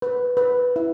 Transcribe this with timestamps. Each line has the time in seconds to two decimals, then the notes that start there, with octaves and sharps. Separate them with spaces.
0.02 B4
0.37 B4
0.76 E4